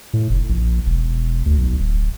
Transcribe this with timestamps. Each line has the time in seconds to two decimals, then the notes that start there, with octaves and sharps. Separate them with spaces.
0.13 A2
0.30 F1
0.49 A#1
0.86 E1
1.46 D2
1.58 B1
1.80 D1